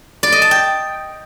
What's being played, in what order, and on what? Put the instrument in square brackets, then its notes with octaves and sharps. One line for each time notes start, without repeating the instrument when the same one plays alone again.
[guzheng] D5
D#5
A5
G5